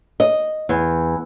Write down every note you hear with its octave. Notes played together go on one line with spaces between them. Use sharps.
D#5
E2